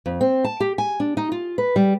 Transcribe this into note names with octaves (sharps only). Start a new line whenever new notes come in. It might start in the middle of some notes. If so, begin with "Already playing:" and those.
F2
C4
A5
G4
G#5
D4
D#4
F4
B4
G3